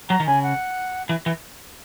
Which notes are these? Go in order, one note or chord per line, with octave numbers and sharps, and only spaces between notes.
F#3 A#5
D#3
C#3 G#5
F#5
E3
E3